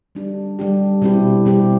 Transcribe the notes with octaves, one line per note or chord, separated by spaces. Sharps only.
G3 D4 G4
G3 D4 G4
B2 G3 C4 E4 G4
B2 G3 C4 E4 G4